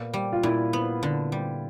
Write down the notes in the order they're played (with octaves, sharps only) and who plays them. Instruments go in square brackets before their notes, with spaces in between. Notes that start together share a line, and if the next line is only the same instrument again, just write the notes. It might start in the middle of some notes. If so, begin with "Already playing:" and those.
Already playing: [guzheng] A#2 B3
G3
[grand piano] F4
[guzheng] A#2 [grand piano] E4
[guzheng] B3
D3
G3